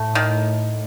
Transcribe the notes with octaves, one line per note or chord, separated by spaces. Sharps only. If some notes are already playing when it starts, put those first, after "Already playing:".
Already playing: A2 A3
D#3